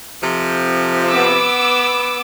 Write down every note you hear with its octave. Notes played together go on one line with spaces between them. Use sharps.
F2 C3 F3
B3 D6 E6